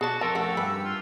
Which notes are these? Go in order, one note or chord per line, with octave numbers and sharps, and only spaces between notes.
B2 F#4 G#4 D5 A5
F2 A4 A#4 F5 A5 C6
A3 C#4 F#4 G4 E6
G2 B4
F4